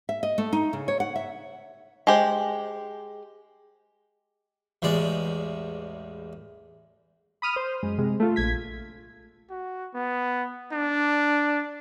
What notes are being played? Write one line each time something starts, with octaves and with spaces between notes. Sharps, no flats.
E5
D#5
A3
D#4
C#3
C#5
F#5
E5
G#3 G4 C5
A1 E2 G#3 D5
B5 D#6 F6
C5
F#2 G#3
C3 G#3
A3 F4
A#1 G#6 B6
F#4
B3
D4